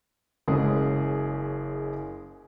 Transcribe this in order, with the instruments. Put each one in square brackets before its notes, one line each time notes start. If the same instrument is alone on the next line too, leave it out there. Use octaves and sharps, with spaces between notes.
[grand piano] F#1 G#3 C#4 G#4